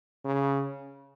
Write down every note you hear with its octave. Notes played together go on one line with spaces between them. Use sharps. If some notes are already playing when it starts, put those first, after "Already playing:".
C#3